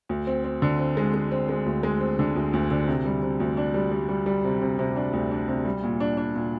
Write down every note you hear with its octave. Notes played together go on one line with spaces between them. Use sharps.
D2
C4
C4
D3
C4
G#3
G#3
C4
G#3
D2
G#3
C4
D3
D2
D2
D3
C3
G3
C3
D2
D4
G3
G3
G3
G3
C3
C3
C3
D4
D2
D4
C3
G3
A#2
D4
D4
A#2